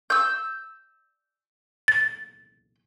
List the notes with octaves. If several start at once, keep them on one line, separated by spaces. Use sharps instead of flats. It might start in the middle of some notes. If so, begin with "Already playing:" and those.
E6 G6
A6